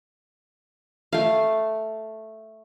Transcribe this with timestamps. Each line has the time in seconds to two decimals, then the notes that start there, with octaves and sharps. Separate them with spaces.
1.13 A3 F5